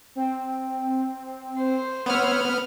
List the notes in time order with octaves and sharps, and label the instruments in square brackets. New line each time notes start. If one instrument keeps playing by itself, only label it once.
[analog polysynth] C4
[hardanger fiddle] C5
[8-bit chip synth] B3 F6 [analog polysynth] C#5 F#5 E6